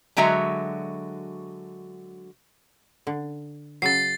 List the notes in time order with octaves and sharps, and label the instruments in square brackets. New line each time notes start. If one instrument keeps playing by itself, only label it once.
[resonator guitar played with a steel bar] D3 F#3 G#3 F#4 E5 A#5
[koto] D3
[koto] C#3 F#3 [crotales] A6 C7